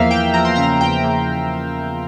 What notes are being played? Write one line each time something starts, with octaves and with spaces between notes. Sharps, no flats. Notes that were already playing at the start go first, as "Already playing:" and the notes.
Already playing: E2 F3 A#3 E5 F5
A#3 G5
F3 A#5
C6
C#3 A#5
E2 G5
A#3